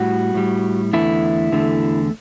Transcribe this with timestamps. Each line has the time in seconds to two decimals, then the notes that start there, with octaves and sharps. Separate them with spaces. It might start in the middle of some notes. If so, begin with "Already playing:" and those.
Already playing: A2 G3 F#4
0.34 A2 G3
0.93 E2 D3 A3 E4
1.52 E2 D3 A3